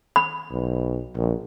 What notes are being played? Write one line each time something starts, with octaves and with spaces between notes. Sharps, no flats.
B5
B1
A#1